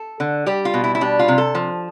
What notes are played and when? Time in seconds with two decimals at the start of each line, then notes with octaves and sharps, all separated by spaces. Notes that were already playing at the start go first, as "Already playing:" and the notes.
Already playing: A4
0.20 D3
0.46 G3 G4
0.65 F4
0.74 B2
0.84 E4
0.95 E4
1.01 G3 D4
1.19 F4
1.28 C3
1.38 A4
1.55 F3